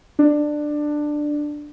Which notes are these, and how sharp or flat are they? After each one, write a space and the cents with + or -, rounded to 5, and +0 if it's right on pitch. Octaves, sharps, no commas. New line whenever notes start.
D4 +15